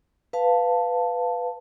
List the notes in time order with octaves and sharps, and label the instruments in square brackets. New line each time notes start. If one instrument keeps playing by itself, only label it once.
[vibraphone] B4 F5 A5